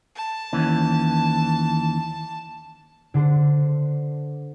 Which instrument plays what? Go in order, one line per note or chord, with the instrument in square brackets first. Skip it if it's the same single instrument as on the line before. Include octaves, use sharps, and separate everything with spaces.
[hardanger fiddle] A5
[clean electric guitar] D#2 E3 C#4
[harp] D3 D4 A4 C5